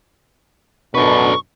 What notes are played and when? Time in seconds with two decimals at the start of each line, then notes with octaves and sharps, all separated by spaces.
0.95 F#2 B2 D4 A4 B4 C#6